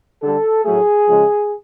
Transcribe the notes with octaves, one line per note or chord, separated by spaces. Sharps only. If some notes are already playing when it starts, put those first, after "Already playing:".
D3 G3 A4
A2 F#3 A3 G#4
C#3 F3 G#3